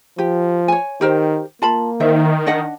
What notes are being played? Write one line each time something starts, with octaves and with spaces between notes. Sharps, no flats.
F3 G4
C#5 G#5
D#3 G4 A#4 C5
A#3 F4 A5 B5
D#3 E4 C5 E5
D4 D#5 F#5